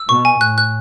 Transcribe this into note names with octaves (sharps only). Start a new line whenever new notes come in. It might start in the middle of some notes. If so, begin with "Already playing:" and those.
Already playing: E6
B2 C#6
G#5
A2 F#6
F#6